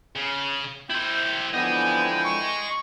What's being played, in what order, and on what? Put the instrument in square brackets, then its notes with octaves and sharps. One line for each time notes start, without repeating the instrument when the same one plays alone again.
[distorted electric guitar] C#3
[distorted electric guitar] E4 C5 [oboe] G5
[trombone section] F2 D3 E3 [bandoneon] B3 [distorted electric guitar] D#5 G#5 [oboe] G5
[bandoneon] C#6